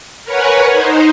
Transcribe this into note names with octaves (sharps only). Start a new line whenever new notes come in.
A#4 B4 C#5 F#5 G#5
D#4 C5